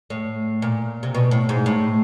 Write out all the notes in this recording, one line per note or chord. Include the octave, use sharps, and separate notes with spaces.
A2
A#2
C3
B2
A2
G#2
A2